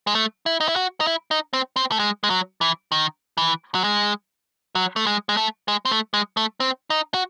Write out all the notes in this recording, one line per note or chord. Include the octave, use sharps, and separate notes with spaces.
G#3
A3
E4
D#4
E4
F#4
D#4
E4
D#4
C4
C4
A3
G#3
G#3
F#3
E3
D#3
E3
F#3
G#3
F#3
A3
G#3
G#3
A3
G#3
C4
A3
G#3
A3
C4
D#4
F#4